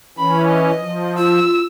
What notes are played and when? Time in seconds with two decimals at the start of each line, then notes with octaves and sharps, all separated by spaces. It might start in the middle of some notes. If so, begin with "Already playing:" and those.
0.18 E3 C#4 B5
0.49 D#5
0.79 F3
1.18 F4 E6